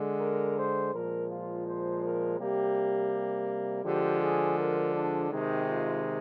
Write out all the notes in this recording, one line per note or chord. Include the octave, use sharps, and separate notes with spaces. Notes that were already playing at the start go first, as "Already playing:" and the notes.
Already playing: D3 G#3
A#4
C5
A#2 F3 G#3 A#4
F4
C5
A#4
C3 G3 A#3 G4
D3 F3 G#3 G4
G#4
A#4
D4
C3 D#3 G#3 D#4
F4